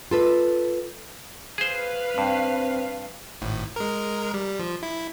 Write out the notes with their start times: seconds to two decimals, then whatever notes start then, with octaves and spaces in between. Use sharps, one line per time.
0.11 F4 A4 B4
1.58 G#4 B4 C5 F5
2.18 G2 C4
3.41 G#1 A2
3.76 G#3 A#4
4.34 G3
4.60 F3
4.83 E4